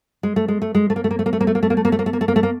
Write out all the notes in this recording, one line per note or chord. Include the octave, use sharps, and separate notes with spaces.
G#3
A3
G#3
A3
G#3
A3
A#3
A3
A#3
A3
A#3
A3
A#3
A3
A#3
A3
A#3
A3
A#3
A3
A#3
A3
A#3
A3
A#3
A3
A#3